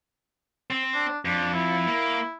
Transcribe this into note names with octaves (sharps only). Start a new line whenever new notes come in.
C4
D4
F2 D4
E4
A#3